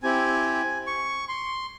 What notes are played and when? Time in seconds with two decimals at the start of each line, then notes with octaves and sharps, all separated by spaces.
0.03 C4 E4 G4 G#5
0.87 C#6
1.29 C6